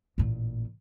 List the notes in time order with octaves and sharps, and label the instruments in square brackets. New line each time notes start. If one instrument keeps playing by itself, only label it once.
[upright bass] A1 A#2